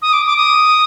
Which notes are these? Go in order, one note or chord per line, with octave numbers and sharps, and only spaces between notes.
D#6
D6
D6
D#6